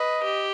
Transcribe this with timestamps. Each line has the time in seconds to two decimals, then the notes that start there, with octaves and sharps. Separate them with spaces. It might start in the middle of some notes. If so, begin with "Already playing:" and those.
Already playing: B4 D#5
0.24 G4